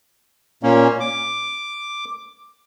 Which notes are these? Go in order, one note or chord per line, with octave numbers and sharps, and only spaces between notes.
A#2 A#3 C#4
D6